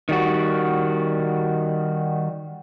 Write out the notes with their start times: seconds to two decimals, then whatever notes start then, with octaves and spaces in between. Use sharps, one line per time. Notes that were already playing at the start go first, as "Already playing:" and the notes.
0.09 D#3 G3 F#4